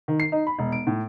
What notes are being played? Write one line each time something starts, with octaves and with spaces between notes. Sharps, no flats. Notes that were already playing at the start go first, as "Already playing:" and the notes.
D#3
C7
D#4
B5
E1
D7
A2